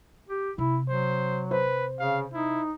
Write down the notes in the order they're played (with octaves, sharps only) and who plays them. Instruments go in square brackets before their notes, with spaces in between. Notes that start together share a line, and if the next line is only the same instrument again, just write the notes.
[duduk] G4
[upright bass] C3 [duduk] E4
[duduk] F#3 [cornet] C5
[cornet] B4 [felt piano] C5
[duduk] C#3 [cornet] F5
[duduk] D#4 [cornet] E4